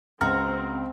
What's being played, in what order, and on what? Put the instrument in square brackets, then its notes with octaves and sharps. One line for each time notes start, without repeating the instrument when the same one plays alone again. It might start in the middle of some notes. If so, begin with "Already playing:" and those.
[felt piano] C#2 [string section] C4 [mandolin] F#4 A#5 [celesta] F6